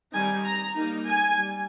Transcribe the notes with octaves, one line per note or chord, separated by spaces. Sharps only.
D#3 G3 C4 D#4 G#5
A#5
G3 A#3 D#4
G#5
G3